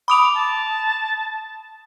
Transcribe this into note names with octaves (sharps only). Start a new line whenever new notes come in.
B5 D6 D#6 F7
A5